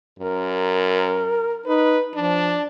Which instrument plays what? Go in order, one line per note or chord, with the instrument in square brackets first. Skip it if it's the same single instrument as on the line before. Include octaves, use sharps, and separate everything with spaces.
[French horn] F#2 [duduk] A#4
[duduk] D#4 [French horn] B4
[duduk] F3 [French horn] D4